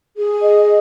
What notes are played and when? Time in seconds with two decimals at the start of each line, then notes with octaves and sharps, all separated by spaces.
0.16 G#4
0.42 D#5